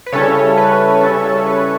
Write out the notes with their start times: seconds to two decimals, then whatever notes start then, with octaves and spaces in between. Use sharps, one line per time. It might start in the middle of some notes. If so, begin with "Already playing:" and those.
0.06 B4
0.12 C#3 G3 C#4 E4 A4 C#5
0.57 B4
0.91 B4
1.01 C#3 G3 C#4 E4 A4
1.24 A4
1.47 B4